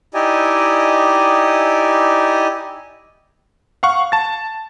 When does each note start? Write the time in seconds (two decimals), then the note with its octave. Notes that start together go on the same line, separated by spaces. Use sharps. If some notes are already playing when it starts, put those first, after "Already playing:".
0.14 D#4 E4 G4 D5 D#5 G#5
3.83 F5 F#5 C#6
4.12 A5 A6